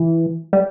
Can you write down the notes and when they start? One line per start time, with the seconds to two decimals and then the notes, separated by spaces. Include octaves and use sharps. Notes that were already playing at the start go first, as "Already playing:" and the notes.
Already playing: E3
0.53 G3